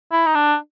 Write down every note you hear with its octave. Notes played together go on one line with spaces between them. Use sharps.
E4
D#4
D4